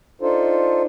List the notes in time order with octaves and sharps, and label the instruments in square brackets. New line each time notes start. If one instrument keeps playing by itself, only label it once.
[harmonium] D4 D#4 F4 A4 C5